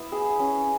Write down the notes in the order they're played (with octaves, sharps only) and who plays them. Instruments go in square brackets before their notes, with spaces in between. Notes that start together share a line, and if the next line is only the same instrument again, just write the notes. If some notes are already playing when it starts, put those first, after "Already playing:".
Already playing: [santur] B3 E4 E5
G#4
C#4